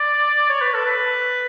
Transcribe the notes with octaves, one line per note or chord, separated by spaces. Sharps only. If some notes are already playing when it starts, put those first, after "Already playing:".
Already playing: D5
C#5
B4
A4
B4